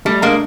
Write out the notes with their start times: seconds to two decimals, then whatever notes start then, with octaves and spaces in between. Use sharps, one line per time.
0.05 G3 A3
0.22 G#3 A#3 D4